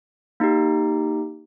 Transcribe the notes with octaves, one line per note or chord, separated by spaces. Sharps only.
A#3 D#4 G4